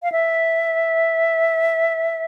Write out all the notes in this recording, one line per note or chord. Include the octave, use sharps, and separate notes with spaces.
F5
E5